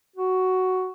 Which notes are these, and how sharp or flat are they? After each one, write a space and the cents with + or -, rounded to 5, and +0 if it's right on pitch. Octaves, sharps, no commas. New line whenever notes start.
F#4 +5